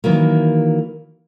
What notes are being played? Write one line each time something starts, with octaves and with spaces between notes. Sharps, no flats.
D#3 E3 F#3 A#3